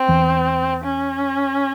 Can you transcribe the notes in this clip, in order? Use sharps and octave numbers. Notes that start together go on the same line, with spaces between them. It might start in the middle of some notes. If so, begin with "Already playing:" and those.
Already playing: C4
E2 E3
C#4